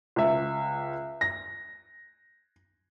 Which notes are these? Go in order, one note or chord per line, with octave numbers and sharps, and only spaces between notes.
C#2 E5
A#6